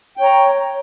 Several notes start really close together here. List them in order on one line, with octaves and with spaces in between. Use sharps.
G5 C#5 A#5